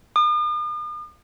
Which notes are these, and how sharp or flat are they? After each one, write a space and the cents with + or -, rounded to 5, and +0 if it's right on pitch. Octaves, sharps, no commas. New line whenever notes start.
D#6 -45